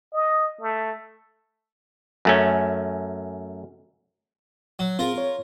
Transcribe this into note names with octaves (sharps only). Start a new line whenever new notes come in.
D#5
A3
F#2 A3 C#4
F#3
C4 F4 G#4 A#4
C#5